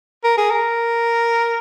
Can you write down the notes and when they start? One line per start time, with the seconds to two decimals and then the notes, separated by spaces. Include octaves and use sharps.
0.24 A#4
0.37 G#4
0.50 A#4